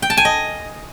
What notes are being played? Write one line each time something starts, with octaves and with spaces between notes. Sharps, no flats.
G5
A5
G#5
D#5